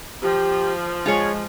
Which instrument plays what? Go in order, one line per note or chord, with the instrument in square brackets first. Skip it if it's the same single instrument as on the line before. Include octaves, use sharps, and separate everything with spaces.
[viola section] F3 [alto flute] G4
[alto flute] G#3 [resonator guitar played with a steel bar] F4 G#4 C#5